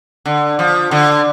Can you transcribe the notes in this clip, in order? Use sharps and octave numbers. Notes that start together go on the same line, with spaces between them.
D3
F3
D3